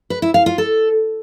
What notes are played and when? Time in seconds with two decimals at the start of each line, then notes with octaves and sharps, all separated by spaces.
0.10 B4
0.22 E4
0.34 F5
0.46 F4
0.58 A4